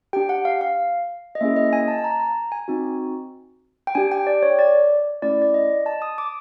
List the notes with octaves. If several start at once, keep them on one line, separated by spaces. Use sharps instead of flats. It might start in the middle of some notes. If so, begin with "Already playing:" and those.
D4 G4 G5
F#5
F5
F5
D#5
A#3 C#4 E4 G#4 E5
D#5
G#5
A5
A5
A#5
A#5
G#5
C4 D#4 F#4
G5
D4 G4 G#5
G5
D5
C#5
D5
A3 C#4 E4 D5
D5
D#5
A5
D#6
D6